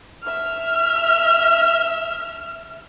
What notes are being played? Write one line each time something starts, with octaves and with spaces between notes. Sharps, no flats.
E5 F6